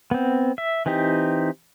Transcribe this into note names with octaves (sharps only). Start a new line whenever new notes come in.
B3 C4
E5
E3 C4 D#4 G4